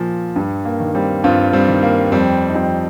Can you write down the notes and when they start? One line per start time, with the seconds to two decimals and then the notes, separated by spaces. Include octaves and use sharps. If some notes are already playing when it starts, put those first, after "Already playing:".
Already playing: A#2 F3
0.36 G2 G3
0.65 A#3
0.80 D#3
0.95 G3 C4
1.24 G2 C4 F4
1.53 G3 C4
1.68 D#3
1.83 A#3
2.12 F2 G3 C4
2.49 D#4
2.55 F3 G3 C4